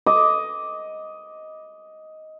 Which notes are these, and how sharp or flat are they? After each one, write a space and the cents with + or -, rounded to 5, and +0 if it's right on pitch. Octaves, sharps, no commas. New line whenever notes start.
D#5 +10 D6 +0